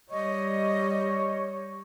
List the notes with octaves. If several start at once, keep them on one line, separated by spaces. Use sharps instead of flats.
G3 C#5 D#5